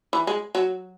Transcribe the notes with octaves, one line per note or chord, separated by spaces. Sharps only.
E3
G#3
F#3